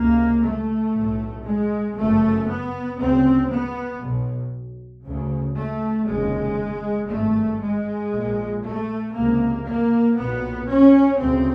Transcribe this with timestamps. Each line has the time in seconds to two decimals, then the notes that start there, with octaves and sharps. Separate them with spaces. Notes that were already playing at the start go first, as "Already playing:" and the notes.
Already playing: C#2 C3 A#3
0.43 A3
0.93 B1 A2
1.45 G#3
1.96 G1 F#2 C#3 A3
2.48 B3
2.99 D2 C#3 C4
3.50 B3
4.01 B1 B2
5.03 C#3
5.08 D2
5.55 A3
6.07 F1 D#2 C#3 G#3
7.09 G#1 G2 A3
7.61 G#3
8.11 A#1 A#2
8.63 A3
9.15 C#2 C3 A#3
9.65 A#3
10.17 B1 A#2 B3
10.68 C#4
11.19 D2 C#3 C4